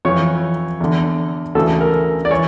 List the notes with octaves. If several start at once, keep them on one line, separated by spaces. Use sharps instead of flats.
F2 E3 C#5
E2 D3
D2 C#3 E3 A4
A#4
D5
E3 C#5